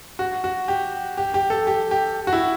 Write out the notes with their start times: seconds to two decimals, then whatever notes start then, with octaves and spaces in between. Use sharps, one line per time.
0.19 F#4
0.44 F#4
0.68 G4
1.17 G4
1.34 G4
1.50 A4
1.67 G4
1.91 G4
2.27 F#4
2.33 E4